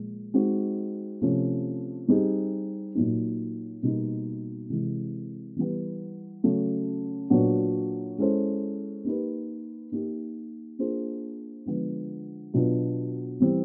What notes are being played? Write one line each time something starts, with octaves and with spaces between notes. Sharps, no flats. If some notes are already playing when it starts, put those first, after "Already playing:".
Already playing: A#2 F3 G#3
G#3 C4 D#4 F#4
C3 F3 A3 C#4
G3 C4 D#4 G#4
A#2 F#3 A#3 D#4
B2 G3 A#3 D#4
C3 E3 G#3
E3 G3 B3
C#3 F#3 A3
A#2 F#3 B3 D4 F#4
G#3 C#4 E4 A4 C5
A#3 D#4 G4 B4
A#3 D#4 G4
A#3 D4 F4 G#4 C5
D3 F3 G#3 B3
B2 F#3 B3 D4 F4
E3 G3 C4